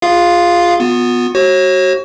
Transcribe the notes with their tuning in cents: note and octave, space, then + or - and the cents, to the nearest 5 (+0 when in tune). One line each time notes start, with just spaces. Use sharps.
F4 +0 G#4 -20 F5 +0
B3 +0 F4 +40
F#4 +25 C#5 -35